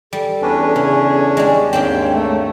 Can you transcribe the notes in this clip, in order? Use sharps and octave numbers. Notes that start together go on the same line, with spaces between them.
G3 A4
E2 C#4 D4 B4
C#3 G#4
G3 G#3 D5
D#2 G#2 C4 D4 G4 C#5 G5
A3